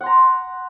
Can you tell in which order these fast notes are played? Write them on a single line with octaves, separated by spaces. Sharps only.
F#5 C6 A#5